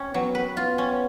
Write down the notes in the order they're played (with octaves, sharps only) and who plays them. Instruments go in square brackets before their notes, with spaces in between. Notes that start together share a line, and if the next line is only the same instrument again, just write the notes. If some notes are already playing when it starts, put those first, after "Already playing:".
Already playing: [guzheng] C#4
[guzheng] F#3 [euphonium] B3
[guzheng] B4
[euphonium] B3 [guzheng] F4
[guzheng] C#4